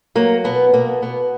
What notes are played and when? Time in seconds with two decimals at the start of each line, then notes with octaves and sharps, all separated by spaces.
0.15 F#3 A#3
0.44 B2 B3
0.74 B2 A#3
1.02 B2 B3